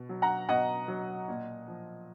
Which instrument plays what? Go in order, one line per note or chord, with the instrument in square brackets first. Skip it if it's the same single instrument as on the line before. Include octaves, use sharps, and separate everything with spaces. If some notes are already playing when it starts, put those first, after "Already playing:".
Already playing: [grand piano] B2
F#3
F#5 A#5
B2 D#5 F#5
F#3
A#2
F3